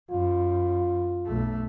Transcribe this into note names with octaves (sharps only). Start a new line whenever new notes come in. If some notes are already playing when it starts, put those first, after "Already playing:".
F#2 F4
B1 A3